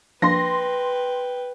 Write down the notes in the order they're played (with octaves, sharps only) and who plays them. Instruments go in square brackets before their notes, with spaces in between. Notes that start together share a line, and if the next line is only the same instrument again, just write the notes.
[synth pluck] F3 A#3 D4 [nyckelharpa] B4 G5 [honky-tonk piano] C6 A#6